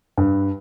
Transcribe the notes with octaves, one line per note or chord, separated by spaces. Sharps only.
G2